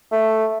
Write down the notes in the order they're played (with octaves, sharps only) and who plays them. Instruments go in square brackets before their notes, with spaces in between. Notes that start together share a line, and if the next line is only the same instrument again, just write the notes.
[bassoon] A3